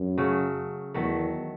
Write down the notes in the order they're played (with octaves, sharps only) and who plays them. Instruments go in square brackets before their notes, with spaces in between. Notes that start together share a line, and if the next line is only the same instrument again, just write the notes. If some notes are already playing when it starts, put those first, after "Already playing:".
Already playing: [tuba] F#2
[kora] C#3 F#3 A3
[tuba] E2 [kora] D#3 F#3 A3